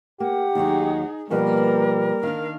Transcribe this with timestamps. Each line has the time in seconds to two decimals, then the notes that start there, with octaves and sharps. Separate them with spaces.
0.20 A#3 G4 F#5
0.55 D#2 F#3 D#4 G#4
1.30 B2 F3 G3 A#3 A#4 B4
2.23 D#3 D4 F5